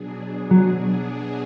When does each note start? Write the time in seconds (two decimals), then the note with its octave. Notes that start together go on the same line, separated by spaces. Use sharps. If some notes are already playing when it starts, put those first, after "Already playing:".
Already playing: B2 F#3 D4 G#4
0.51 F#3